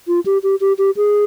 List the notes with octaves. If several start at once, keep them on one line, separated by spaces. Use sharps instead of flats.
F4
G4
G4
G4
G4
G#4